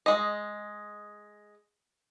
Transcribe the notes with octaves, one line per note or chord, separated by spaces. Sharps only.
G#3 D#5